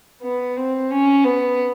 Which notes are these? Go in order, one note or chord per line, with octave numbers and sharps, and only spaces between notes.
B3
C4
C#4
B3